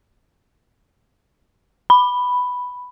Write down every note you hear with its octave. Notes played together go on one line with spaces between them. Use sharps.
B5